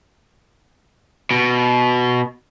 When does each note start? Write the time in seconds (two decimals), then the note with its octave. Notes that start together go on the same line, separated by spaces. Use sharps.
1.31 B2